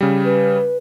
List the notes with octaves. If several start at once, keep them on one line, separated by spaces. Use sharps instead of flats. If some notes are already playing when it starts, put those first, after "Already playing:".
C#3 G3
B4